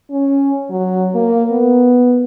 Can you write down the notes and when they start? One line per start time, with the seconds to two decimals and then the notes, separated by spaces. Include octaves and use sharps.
0.10 C#4
0.70 F#3
1.15 A#3
1.51 B3